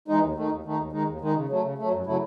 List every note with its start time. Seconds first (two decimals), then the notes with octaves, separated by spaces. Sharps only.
0.08 E3 G#3 D#4
0.22 D#2
0.35 D#3 A3 D#4
0.49 D#2
0.64 D#3 A3 D#4
0.78 D#2
0.92 D#3 G#3 D#4
1.07 D#2
1.21 D#3 G#3 D#4
1.35 C#3
1.49 F#3 A3
1.63 C#3
1.78 F#3 A3
1.91 F#2
2.06 C#3 F#3 A3 E4